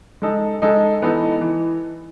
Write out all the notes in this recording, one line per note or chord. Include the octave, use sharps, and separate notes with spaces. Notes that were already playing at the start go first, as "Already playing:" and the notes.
G#3 D#4 A4 D#5
G#3 D#4 A4 D#5
E3 B3 D#4 A4
E3